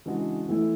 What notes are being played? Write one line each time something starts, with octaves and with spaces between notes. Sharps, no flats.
C#3 E3 G#3 D4 F#4
E3 A3 E4